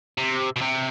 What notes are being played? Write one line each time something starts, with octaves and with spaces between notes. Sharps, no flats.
C3
B2
C3